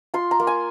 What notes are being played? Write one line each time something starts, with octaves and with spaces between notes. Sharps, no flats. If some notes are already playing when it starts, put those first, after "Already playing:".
F4 C6
A#5
A#3
G#5